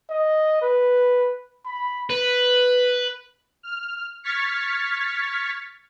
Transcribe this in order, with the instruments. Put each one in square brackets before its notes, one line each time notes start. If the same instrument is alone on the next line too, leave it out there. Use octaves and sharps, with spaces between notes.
[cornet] D#5
B4
B5
[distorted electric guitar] B4
[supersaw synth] F6
C#6 F6 G#6 A6 B6 C#7